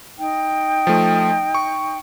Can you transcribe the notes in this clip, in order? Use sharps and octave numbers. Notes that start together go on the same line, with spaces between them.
D#4 G5
F3 A3
C#6